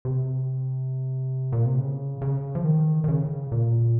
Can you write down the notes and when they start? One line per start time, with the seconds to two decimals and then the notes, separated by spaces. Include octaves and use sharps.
0.05 C3
1.53 A#2
1.65 C3
1.79 C#3
2.22 C#3
2.55 F3
2.65 D#3
3.04 D#3
3.08 C#3
3.52 A#2